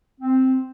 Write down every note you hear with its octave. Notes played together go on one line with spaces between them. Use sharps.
C4